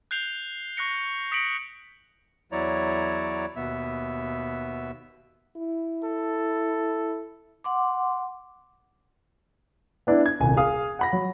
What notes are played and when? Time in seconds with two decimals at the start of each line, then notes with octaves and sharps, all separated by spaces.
0.11 F#6 G6 C7 F7 G7
0.77 C#6 F#6 A#6 C#7
1.32 D#6 A#6 B6 C#7 D7 F#7
2.52 E2 F#3 E4 C#5 D5 A#5
3.56 D#2 B2 B3 E5
5.57 E4
6.04 A4
7.64 F#5 C6 D6
10.07 B3 D4 E4
10.26 G#6
10.40 D#1 C2 G#5
10.57 G#4 F5 D#6
10.99 F#5 B5 A#6
11.13 F#3